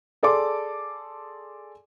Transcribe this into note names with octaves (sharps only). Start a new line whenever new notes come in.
G#4 A4 D5 A5 C6 D6